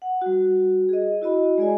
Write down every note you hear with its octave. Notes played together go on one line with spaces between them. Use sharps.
F#5
G3 F#4
G#4 D#5
E4 F#4 D#5 B5
G#3 G#4 D5 D#5 G#5